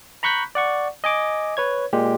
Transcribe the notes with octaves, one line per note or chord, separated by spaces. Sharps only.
A#5 B5 C#6 F#6 G6 B6
D5 F#5 C#6
D#5 G#5 D6
B4 C#5 G#6
A#2 G#3 G4